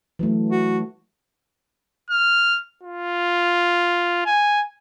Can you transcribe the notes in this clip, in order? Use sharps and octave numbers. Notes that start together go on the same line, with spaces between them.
E3 F#3 A3
F#4
F6
F4
G#5